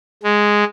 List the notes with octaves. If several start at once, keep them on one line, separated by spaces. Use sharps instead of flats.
G#3